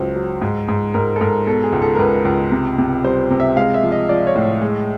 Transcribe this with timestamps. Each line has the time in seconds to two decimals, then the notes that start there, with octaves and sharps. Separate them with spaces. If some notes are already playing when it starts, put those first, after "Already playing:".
Already playing: C#2 F#3 C5
0.16 F#3
0.42 G#2
0.68 G#2
0.94 G#2 A#4
1.16 A4
1.21 G#2 A#4
1.46 B2 A4
1.64 G#4
1.72 C#2
1.82 A4
1.95 A#4
1.99 C#2 B4
2.25 C#2
2.52 C3
2.78 C3
3.04 G3 C5
3.30 C3
3.40 E5
3.56 G#3 F5
3.74 E5
3.83 F3
3.92 D#5
4.09 F3 D5
4.27 C#5
4.36 A2
4.61 G#3